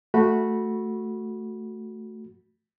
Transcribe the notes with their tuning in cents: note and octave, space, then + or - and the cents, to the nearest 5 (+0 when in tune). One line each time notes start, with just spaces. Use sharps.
A3 +0 F#4 -10 B5 -15